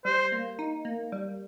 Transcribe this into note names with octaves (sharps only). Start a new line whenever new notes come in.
G3 C5
A#3
D#4
A#3
G3